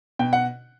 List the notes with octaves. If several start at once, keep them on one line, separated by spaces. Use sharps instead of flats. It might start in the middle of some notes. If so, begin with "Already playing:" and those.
B2 G5
F#5